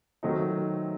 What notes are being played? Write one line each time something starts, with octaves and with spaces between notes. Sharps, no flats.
D#3 F#3 A3 C4 D#4